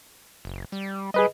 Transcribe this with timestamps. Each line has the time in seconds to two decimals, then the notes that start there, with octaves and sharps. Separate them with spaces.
0.45 F#1
0.72 G3
1.14 G3 G#4 B4 D#5